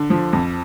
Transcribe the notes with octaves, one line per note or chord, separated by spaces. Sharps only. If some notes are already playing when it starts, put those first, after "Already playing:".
Already playing: D3
F3
F2